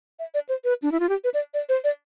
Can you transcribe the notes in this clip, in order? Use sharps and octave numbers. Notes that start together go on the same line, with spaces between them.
E5
D5
C5
B4
D4
E4
F4
G4
B4
D5
D5
C5
D5